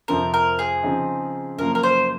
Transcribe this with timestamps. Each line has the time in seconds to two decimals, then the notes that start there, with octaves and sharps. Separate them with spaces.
0.08 F2 C3 F3 C4 A#4
0.34 A#4
0.59 G#4
0.83 C#3 F3 C4 D#4
1.58 F#2 C#3 F3 A#3 A#4
1.75 A#4
1.83 C5